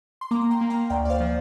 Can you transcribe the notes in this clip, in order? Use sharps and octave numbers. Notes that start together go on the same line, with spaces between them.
C6
A#3 A#5 D6
A#5
G5 C6
A#3
F5 A#5
D2 D5 G5
D5
C5 F5
F3